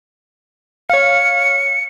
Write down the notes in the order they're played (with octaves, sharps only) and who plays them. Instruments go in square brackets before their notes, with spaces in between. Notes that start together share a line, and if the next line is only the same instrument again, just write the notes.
[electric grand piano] C#5 F5 [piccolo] C#7